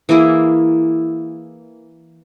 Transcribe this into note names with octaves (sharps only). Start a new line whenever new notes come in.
E3 A#3 E4 G#4